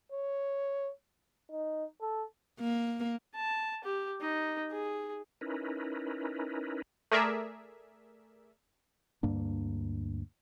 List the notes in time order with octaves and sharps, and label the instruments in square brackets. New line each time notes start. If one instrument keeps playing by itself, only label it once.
[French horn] C#5
[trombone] D#4
A4
[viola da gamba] A#3
[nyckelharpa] A5
G4
D#4
G#4
[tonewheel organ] C#4 D#4 E4 A#4 B4
[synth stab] A3 G#4 A#4 D5 E5
[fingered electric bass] D2 G2 A#3 D4